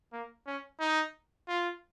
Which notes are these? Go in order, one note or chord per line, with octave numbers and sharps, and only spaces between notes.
A#3
C#4
D#4
F4